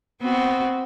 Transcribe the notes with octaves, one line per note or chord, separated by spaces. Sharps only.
B3 C4 F#4